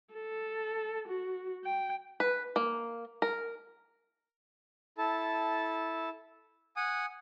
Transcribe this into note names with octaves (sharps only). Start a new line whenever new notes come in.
A4
F#4
G5
B4
A#3
A#4
E4 A4 A5
F#5 G#5 D#6